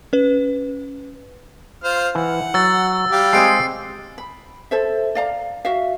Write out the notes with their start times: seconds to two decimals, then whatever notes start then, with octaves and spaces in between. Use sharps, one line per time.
0.13 C#4 B4
1.84 F4 C5 F6
2.15 E3 F#5
2.54 F#3 E6 A6
3.12 G3 G4 F5
3.33 G#3 C4 G#4 C7 D7
4.18 B5
4.71 A4 C5 E5
5.15 D5 F5 A#5
5.65 F#4 E5 F5